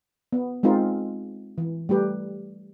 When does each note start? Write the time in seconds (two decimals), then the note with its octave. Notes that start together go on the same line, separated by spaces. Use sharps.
0.33 B3
0.63 G#3 C4 D#4 F4 A#4
1.58 E3
1.89 G3 A3 G4 B4